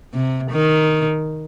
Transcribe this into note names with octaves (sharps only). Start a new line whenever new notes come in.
C3
D#3